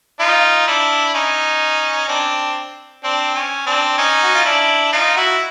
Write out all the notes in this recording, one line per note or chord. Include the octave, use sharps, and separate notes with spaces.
D#4 F4
D4 E4
C#4 D#4
C4 D4
C4 D4
C#4
C4 D4
C#4 D#4
F#4
F4
D4 E4
D#4 F4
E4 F#4